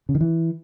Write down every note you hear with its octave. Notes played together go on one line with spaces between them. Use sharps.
C#3
D#3
E3